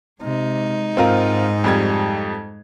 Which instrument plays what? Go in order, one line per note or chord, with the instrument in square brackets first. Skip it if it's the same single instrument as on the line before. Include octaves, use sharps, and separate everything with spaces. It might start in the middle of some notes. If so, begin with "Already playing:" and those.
[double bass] C3 [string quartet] G#3 D#4
[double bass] G#2 [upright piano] C4 F4 A#4
[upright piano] F2 G3 G#6